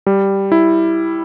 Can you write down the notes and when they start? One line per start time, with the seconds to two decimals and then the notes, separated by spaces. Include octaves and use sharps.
0.07 G3
0.52 E4